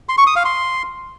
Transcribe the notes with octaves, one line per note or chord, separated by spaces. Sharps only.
C6
C#6
D#6
F5
C6